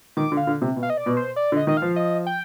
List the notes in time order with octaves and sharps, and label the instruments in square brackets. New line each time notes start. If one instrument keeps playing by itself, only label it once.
[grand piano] D#3 [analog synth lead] D6
[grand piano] D3
[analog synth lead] F5
[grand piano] D3
C3
B2
[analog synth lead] F5
D#5
D5
[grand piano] B2
[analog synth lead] C5
D5
[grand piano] D3
[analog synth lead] D#5
[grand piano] D#3 [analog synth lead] D#5
[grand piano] F3 [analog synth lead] F5
[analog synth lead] D#5
G5